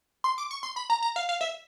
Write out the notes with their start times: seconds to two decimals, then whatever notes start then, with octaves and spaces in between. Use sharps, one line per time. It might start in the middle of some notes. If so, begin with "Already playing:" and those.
0.24 C6
0.38 D6
0.51 C#6
0.63 C6
0.76 B5
0.90 A#5
1.02 A#5
1.16 F5
1.29 F5
1.41 E5